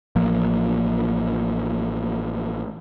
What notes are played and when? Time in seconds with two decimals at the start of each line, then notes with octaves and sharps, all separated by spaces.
0.16 A1 F3 A#3